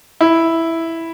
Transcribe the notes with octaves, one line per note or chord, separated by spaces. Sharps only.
E4